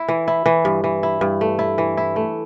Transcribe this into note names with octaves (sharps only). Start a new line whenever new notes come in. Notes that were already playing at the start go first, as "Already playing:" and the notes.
Already playing: E4
E3
E4
E3
G2
E3
E4
G2
A3
E4
E3
E4
A3